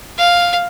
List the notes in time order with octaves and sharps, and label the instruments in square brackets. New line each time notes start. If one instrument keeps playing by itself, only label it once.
[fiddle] F5